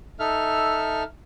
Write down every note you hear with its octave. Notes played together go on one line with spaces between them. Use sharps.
D#4 A4 E5 F6